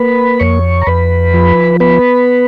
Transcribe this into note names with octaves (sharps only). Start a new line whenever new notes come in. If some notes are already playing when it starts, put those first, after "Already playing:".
Already playing: A#3 B4 B5
F2 C#5 C#6
A#5
F2 B4 B5
F3
B3 B4 B5